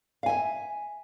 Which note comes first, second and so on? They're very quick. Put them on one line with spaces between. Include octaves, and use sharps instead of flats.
F5 G#5 E5